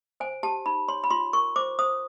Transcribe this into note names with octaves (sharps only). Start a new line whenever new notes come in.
C5 G#5
G4 A5
D#4 B5
C#5 C6
B5
F4 C6
A#4 C#6
C5 D6
C5 D#6